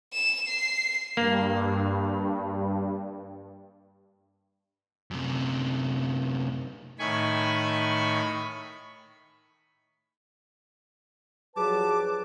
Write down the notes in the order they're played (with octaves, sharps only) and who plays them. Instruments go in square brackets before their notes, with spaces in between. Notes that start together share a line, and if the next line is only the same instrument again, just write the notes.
[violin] E7
C7
[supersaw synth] G2 [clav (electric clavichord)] A#3
[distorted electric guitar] F#2 C3
[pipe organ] A2 D#3 G#5 B5 C#6
[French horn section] G2 F3 F#3 [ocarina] G#4 [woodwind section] B4 A5 [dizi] D6